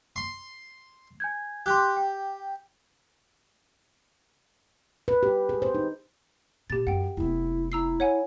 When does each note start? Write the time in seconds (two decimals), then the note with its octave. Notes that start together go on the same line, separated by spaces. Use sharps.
0.16 C6
1.20 G#5 G6 G#6
1.66 G4 C6 D6 F#6
1.97 G5
5.08 B4
5.23 G4
5.49 G#4
5.62 C5
5.75 D#4
6.70 A#2 D3 G4 A6
6.87 F#2 F#5 G5
7.17 F1 B3 E4
7.72 E4 A#5 E6 C7
8.00 C#5 F#5 G#5